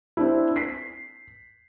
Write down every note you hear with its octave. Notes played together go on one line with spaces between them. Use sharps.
C4 D4 E4
B6 C7